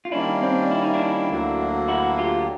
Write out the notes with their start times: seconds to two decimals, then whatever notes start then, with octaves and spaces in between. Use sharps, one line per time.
0.05 F4
0.12 D#3 G3 A#3 C#4 D4 E4
0.42 C4 D4
0.71 E4
0.83 D#4
0.94 D4 E4
1.30 D2 D3 F#3 A#3
1.88 E4 F#4
2.18 F4 G4